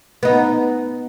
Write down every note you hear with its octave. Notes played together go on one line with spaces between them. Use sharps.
B3 D#4